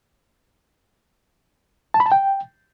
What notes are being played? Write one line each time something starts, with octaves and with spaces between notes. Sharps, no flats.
A5
B5
A5
G5